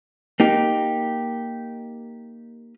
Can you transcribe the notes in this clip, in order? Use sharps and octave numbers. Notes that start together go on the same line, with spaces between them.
A#3 D#4 G4